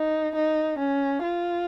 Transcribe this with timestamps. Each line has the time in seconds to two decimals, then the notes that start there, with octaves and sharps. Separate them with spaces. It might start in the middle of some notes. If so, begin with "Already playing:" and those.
Already playing: D#4
0.35 D#4
0.79 C#4
1.23 F4